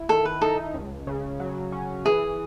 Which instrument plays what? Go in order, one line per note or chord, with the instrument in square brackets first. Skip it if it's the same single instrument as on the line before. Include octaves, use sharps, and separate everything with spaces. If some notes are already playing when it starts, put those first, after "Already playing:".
Already playing: [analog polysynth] E4
[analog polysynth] D#3 [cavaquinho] A4
[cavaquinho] B4
[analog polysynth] D#4 [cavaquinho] A4
[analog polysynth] C#2
C#3
F#3
C#4
[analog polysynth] E3 [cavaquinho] G#4